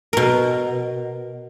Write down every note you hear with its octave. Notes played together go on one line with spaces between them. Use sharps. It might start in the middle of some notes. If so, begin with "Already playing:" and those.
B2 A#4